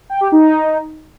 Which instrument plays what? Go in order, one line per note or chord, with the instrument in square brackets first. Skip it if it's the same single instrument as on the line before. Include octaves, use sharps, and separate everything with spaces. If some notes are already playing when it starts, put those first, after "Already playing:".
[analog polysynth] G5
G4
D#4